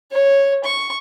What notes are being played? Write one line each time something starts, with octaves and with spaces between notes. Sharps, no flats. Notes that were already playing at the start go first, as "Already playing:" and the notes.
C#5
C#6